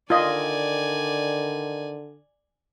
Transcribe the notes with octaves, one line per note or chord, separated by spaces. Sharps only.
D3 D#3 F4 D5 D#5 G#5